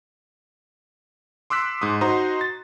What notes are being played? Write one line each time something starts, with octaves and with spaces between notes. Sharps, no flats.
C6 D6 E6 F#6 B6
G#2 C6 D#6
D#4 F#4 C5 A#5 C6 D#6
A6